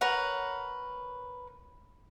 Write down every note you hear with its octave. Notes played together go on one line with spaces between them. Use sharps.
A#4 B4 C#5 F#5